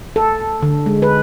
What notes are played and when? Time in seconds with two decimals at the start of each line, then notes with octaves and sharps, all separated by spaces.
0.16 A4
0.62 D3
0.86 G#3
1.02 B4